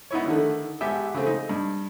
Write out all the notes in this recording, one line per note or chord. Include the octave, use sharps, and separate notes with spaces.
B3 D#4 E4 C#5
D3 D#3 A3
G#1 B3 G4 E5 G5 G#5
C#3 A3 C4
D#4
G2